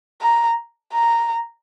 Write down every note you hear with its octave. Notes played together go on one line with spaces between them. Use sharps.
A#5
A#5